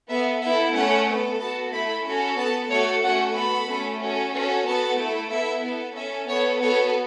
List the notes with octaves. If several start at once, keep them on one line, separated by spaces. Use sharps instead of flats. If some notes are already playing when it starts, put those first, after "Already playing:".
B3 A4 E5
B3 E4 A4 E5
A3 C#4 A4 F#5
B3 A4
B3 F#4 A4 A5
A3 E4 A4 B5
C#4 F#4 A4
B3 A4 A5
A3 F#4 A4 C#5
A3 C#4 F#4 A4 F#5
B3 F#4 A4 B5
A3 C#4 A4
C#4 F#4 A4
C#4 F#4 A4
B3 F#4 A4 A5
A3 E4 A4
B3 E4 A4 E5
B3 A4
C#4 A4 E5
B3 A4 C#5
B3 F#4 A4 C#5